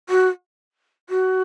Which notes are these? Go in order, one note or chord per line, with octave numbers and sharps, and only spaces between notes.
F#4
F#4